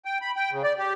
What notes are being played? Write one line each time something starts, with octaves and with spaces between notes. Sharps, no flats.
G5
B5
G5
C#3
D5
G4